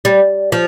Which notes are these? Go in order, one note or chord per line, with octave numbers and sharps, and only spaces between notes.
G3
F3